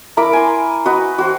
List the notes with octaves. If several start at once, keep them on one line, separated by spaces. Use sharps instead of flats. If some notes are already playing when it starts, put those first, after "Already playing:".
E4 A#4 B5 D6
G#5 C6
F#4 B4 D#5
F#4 C5